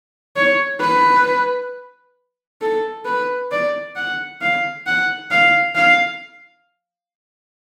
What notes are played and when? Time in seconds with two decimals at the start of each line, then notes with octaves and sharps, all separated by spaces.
0.36 C#5
0.80 B4
2.61 A4
3.05 B4
3.52 D5
3.96 F#5
4.41 F5
4.86 F#5
5.31 F5
5.75 F5